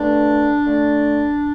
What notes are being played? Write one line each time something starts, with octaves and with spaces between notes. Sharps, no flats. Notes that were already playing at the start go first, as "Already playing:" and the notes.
Already playing: G2 D3 A3 D4
D3 A3